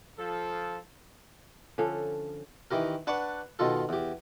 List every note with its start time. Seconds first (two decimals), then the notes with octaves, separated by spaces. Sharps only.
0.18 F3 A4
1.78 D3 F3 C#4 A4
2.71 D#3 E3 G4 A#4
3.07 D4 B4 D5 F#5 A5 C#6
3.59 B2 D#3 F4 A4
3.89 E2 G4